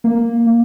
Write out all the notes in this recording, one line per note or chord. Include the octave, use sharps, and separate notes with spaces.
A#3